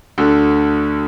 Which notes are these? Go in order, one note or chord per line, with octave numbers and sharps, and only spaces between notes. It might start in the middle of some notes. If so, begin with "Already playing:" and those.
D2 D3 D4 F#4 A4